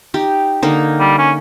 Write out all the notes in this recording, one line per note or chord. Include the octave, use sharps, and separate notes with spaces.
D#4 G4
D3 A#3 D#4
G3
C#4